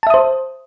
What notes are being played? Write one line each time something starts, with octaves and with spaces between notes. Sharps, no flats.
C5 E5 A5 D#6